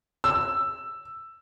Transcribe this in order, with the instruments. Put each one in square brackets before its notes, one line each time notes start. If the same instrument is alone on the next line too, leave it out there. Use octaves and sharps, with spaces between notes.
[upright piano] E6